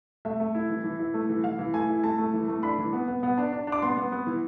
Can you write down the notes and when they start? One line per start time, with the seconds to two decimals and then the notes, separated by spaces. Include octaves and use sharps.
0.25 A3 E5
0.40 A3
0.55 E4
0.70 E3
0.84 E3
0.99 E4
1.14 A3
1.29 E3
1.44 E3 F5
1.59 E3
1.74 A3 G#5
1.89 E4
2.04 A3 A5
2.18 A3
2.34 E3
2.48 A3
2.63 D4 B5
2.78 E3
2.93 B3
3.08 B3
3.23 B3
3.38 D4
3.53 D4
3.67 D4
3.72 D6
3.82 B3 C6
3.97 B3
4.12 B3
4.27 E3